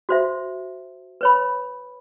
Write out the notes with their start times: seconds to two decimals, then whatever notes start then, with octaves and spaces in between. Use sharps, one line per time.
0.09 F#4 C5 E5
1.21 B4 C#5 B5